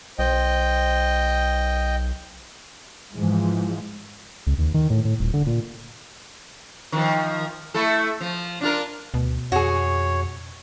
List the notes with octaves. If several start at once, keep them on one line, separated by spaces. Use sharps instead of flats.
B1 C5 D#5 G5
G#2 E3 F3 G#3
C#2
D#2
D#3
A2
A2
D#1
D3
A#2
D#3 F3
A3 E4 A4
F3
D4 F4 A#4
D2 B2
F2 F#4 G#4 C#5